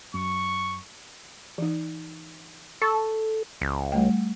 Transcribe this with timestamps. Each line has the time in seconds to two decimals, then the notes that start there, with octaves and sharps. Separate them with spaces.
0.14 F#2 C#6
1.58 E3 D#4
2.82 A4 C#6
3.61 C#2
3.92 G3 A3 G5